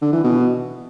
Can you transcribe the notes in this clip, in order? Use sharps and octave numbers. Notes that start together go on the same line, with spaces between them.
D3
E3
B2